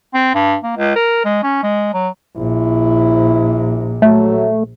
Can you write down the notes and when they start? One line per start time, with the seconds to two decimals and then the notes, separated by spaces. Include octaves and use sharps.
0.14 C4
0.35 G2
0.63 A#3
0.77 C#2
0.96 A#4
1.25 G#3
1.43 C#4
1.63 G#3
1.94 F#3
2.37 A#1 E4
4.02 F#3 A3